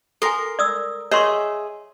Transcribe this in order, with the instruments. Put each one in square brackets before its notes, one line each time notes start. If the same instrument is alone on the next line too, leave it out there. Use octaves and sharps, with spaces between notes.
[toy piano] A4 G#5 [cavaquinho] A#4 C6
[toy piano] D5 D#6 E6
[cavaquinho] G#4 D#5 E5 [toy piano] C#5 C6 C#6